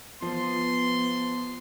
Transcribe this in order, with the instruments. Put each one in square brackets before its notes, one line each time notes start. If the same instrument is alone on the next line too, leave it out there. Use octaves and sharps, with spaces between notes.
[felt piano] F3 [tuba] B3 [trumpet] C6